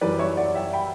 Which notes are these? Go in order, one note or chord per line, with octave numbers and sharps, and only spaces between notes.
F#2 E3 G3 B4 D5
C#5 E5
D5 F#5
E5 G5
G5 B5